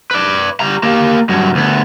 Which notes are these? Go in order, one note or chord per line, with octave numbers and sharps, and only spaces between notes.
B4 D5
G3 A#5
A#3 G4
G2 F#3
D2 B3